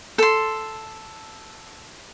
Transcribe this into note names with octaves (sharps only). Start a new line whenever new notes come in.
A4 C6